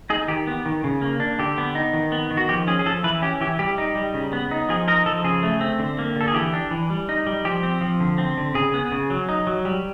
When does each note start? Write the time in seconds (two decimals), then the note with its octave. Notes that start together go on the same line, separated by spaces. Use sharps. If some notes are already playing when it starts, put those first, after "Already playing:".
0.10 D#4 G#4
0.28 D#3 G4
0.47 B3
0.66 D#3
0.84 C#3
1.01 A#3
1.20 D4
1.39 D3 G4
1.58 B3
1.75 D#4
1.93 D#3
2.12 B3
2.31 D#3
2.37 F#4
2.49 F3 G4
2.67 C#4 G#4
2.79 G#4
2.85 F3 A4
3.04 E3 B4
3.22 C#4 G4
3.41 E3 G4
3.59 G3 G4
3.78 D#4
3.95 G3
4.14 C#3
4.33 B3
4.51 D#4
4.69 F3 G#4
4.88 D#4 A#4
5.06 F3 A4
5.24 C#3 G#4
5.43 A3
5.61 C4
5.79 D3
5.99 A#3
6.16 D3 A4
6.28 G#4
6.34 E3 G4
6.53 D4
6.71 E3
6.90 G3
7.09 D#4
7.27 G3
7.45 F3 G4
7.63 C4
7.81 F3
8.00 D3
8.18 C4
8.37 D3
8.55 C#3 G#4
8.74 B3
8.92 C#3
9.10 F#3
9.29 D#4
9.47 F#3
9.65 G3